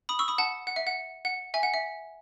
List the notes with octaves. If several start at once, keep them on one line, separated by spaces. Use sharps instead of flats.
B5 D#6
C#6 E6
B5 D#6
F#5 A5
F#5
E5
F#5
F#5
E5 G#5
F#5
E5